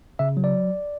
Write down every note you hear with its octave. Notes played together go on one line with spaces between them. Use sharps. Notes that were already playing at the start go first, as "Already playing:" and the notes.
C#3 E5
F#3
D5